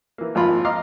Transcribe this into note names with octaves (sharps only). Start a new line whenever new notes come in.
E3 A#3
G#1 F2 F4 B5
D#5 F5 A#5 C6 D6 F6